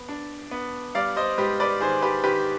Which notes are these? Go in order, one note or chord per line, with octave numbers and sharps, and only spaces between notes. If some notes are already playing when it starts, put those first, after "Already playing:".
Already playing: B3
D4
B3
G3 D5 F5
C5 D#5
G#2 G4 B4
B4 D5
D#3 G#4 C5
G4 B4
D#3 G4 B4